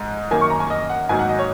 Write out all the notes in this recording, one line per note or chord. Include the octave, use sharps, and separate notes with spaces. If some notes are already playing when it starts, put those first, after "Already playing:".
Already playing: G#2 G#3
F#2 D#3 A#3 G#5
C#6
A#5
G#5
D#5
F#5
G#2 D#3 F#3 A#3 G#5
F#5
D#5
C#5